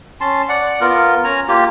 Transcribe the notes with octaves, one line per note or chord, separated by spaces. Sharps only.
C#4 A5 C6
D5 F#5
B3 F4 A#4
C#4 G#5 A#5
A#3 F4 G4